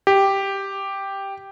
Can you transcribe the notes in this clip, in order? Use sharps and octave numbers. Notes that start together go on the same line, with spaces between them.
G4